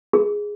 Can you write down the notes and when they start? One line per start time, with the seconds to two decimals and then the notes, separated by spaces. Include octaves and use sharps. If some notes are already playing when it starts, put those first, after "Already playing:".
0.13 G#4